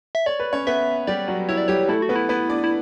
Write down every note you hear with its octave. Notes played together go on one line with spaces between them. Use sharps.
E5
C#5 D5
B4
C#4 C#5
B3 B4 E5
G3 G4 D5
F#3 F#4
E4 C#5
D5
G3 G4 C#5
A3 E4 A4
F#4
B3 B4
E4
B3 E4 B4
D4 D5
E4